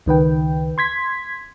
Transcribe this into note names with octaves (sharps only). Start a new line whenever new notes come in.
C#2 D#3 B4 G5
C6 G#6 B6